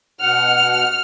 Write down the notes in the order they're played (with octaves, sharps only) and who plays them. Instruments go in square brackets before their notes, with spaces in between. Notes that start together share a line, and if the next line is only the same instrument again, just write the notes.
[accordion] B2 F#5 [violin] F6